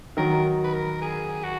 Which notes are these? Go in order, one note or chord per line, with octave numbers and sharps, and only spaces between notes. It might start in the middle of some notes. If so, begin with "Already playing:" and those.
D#3 F#3 A#4
B4
A#4
G#4
F#4